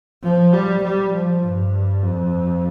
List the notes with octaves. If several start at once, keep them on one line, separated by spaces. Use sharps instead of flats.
F3
G3
G3
F3
G2
F2